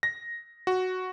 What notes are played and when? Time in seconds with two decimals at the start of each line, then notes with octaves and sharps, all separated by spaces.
0.03 A#6
0.67 F#4